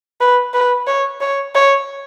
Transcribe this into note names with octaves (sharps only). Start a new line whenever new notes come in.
B4
B4
C#5
C#5
C#5